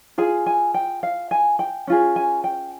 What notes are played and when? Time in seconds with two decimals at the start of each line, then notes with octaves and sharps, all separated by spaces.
0.18 F4 G#4 G#5
0.46 G#5
0.74 G5
1.03 F5
1.31 G#5
1.59 G5
1.87 C#4 F4 G#4
2.16 G#5
2.44 G5